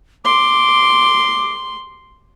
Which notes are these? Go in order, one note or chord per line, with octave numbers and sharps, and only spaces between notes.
C6 D6